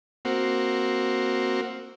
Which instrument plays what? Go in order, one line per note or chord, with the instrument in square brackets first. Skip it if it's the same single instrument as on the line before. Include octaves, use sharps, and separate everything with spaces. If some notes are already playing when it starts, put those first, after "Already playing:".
[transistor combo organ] A#3 C4 F#4